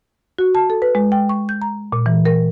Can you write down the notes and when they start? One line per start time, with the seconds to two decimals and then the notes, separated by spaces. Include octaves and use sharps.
0.39 F#4
0.55 A5
0.70 A4
0.82 B4
0.95 G#3
1.12 G5
1.29 C#6
1.49 G6
1.62 A#5
1.92 A#2
2.06 E3
2.25 A#4